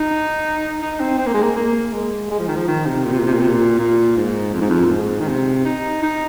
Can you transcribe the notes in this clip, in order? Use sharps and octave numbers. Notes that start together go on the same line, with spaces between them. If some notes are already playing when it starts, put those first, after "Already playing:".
Already playing: D#4
D#4
C4
C4
A#3
G#3
A#3
A#3
G#3
G#3
F3
D#3
F3
D#3
C3
A#2
C3
A#2
C3
A#2
C3
A#2
A#2
G#2
F2
G#2
F2
A#2
G#2
D#3
C3
D#4
D#4